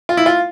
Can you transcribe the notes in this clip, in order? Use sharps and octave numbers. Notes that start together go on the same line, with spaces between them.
F4
E4
F4